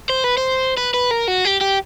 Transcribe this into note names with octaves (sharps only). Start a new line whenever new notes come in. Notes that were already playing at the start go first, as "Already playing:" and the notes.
C5
B4
C5
B4
B4
A#4
F#4
G4
G4